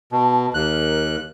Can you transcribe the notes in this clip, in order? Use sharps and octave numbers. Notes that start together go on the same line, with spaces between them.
B2 A5
D#2 A#4 F#6